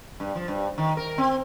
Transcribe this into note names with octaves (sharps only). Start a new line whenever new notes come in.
G2
F3
G2
D#3
A#4
C4